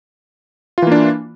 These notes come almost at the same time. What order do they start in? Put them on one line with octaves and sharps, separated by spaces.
F4 E3 A#3 D4